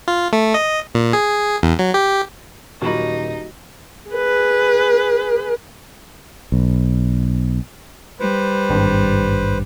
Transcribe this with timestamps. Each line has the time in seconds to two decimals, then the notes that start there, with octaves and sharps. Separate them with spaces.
0.08 F4
0.33 A3
0.54 D#5
0.95 A#2
1.13 G#4
1.63 E2
1.79 F#3
1.94 G4
2.82 D#1 F3 F#3 A#3 D#4 F#4 B5
4.10 G#4 B4
6.52 B1
8.20 G3 B4 C5
8.70 G#1 G2